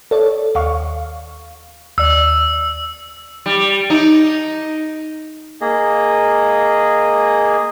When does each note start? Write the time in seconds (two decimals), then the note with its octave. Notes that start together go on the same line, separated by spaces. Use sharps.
0.11 A4 C#5 D5
0.55 D#2 F5 C#6
1.98 D#2 D5 E6
3.46 G3
3.90 D#4
5.61 A#3 G#4 D#5